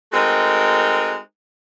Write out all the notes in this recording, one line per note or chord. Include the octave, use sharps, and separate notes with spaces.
G#3 A3 C4 D#4 F#4 A#4